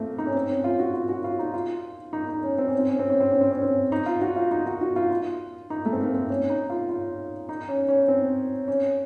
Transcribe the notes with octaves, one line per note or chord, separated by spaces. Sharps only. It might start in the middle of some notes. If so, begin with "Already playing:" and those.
Already playing: A3 A#3 C4
D#4
C#4
C4
C#4
F4
F#4
F4
F#4
F4
D#4
F4
D#4
D#4
C#4
C4
C#4
C4
C#4
C4
C#4
C4
C#4
C4
C#4
C4
D#4
F4
F#4
F4
D#4
F#4
F#4
F4
F4
D#4
A3
C4
A#3
C4
C#4
D#4
F4
F4
D#4
C#4
C#4
C4
C#4